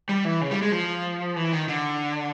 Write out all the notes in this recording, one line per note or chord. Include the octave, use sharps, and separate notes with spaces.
G3
E3
C#3
G3
G#3
F3
E3
D#3
D3